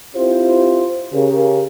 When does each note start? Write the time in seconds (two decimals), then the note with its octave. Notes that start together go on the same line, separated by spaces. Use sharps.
0.16 C4 E4 F4 G4 C5
1.13 C#3 G4 A#4